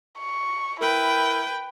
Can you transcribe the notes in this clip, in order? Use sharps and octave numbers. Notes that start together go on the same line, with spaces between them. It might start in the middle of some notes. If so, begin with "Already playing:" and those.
C#6
E4 A#4 B4 G5